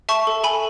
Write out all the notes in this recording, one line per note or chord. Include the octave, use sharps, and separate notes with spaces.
E5 A5 C#6
A4
A4 G#5 B5